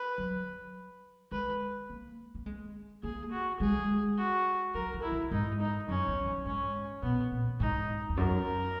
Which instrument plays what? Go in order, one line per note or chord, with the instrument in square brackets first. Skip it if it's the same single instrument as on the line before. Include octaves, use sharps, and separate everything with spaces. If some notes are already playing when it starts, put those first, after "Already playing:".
Already playing: [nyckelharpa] B4
[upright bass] F#3
[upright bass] G#3 [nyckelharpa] B4
[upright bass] A#3
A#3
G#3
[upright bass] A#3 [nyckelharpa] G#4
[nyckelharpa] F#4
[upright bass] G#3 [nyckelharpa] G#4
[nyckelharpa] F#4
[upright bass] F#3 [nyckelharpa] A#4
[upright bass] E3
[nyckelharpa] E4
[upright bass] E3
[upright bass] G#2 [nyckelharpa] D#4
[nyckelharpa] D#4
[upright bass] F#2 [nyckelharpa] C#4
[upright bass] E2
F#2
[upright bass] G#2 [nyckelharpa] C#4
[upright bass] B2 [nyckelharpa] B3
[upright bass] A#2
[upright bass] G#2 [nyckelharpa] D#4
[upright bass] E2
[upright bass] F#2 [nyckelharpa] A#4